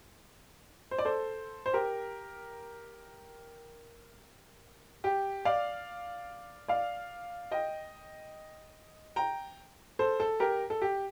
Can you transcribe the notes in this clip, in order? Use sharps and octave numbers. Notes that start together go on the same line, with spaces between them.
C5
D5
A4 C5
C5
G4 A#4
G4
D5 F5
D5 F5
D#5 G5
G5 A#5
A4 C5
A4
G4 A#4
A4
G4